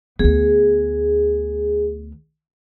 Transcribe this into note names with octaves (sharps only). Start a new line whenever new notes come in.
D2 B3 G#4